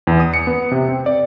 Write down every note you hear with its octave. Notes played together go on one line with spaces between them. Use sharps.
E2
D#6
C#7
B3
C3
C4
D5